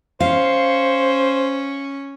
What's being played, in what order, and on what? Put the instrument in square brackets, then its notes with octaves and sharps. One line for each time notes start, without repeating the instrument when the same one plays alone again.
[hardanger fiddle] C#4 [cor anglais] C5 [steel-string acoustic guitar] F5